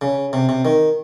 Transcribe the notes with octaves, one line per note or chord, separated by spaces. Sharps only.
C#3
C3
C3
D#3